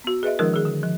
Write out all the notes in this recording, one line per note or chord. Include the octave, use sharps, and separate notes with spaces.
B3 F#4
G#4 B4 D#5 E5
D#3 F3 G#3 D4 E4 A#4
D#3 G#4
D3
F3